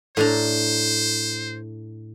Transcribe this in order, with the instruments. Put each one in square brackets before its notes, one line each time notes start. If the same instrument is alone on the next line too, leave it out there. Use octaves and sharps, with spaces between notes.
[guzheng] A2 D4 A#5 [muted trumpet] C5